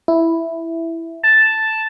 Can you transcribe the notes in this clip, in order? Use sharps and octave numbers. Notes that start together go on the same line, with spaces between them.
E4
A5